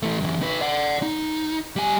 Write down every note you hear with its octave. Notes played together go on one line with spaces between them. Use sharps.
E3 A3
F#2 E3
D#4 B4
D5 F#5
D#4
G3 G#5